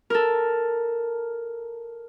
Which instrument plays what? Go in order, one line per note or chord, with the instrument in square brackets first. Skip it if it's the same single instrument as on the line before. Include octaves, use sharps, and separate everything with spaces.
[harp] A4 A#4